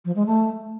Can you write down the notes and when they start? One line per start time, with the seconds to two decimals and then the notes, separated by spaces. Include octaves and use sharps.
0.05 F3
0.15 G#3
0.26 A3